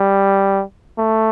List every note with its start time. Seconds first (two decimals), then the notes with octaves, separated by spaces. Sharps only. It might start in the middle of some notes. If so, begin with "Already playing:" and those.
Already playing: G3
0.98 A3